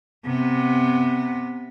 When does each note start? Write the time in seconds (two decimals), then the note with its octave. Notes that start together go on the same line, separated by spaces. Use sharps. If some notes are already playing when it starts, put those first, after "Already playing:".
0.25 C3 B3